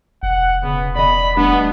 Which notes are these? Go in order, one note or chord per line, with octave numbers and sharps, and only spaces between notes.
E1 F#5
C#3 B3
D5 D#5 B5
G3 A3 B3 D4